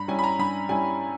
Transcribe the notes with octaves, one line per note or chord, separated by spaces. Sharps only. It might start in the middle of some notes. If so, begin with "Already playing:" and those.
Already playing: G2 A#5 B5
G3 C#4 E4 G#5
B5
A#5
G2 B5
G3 C#4 E4 G#5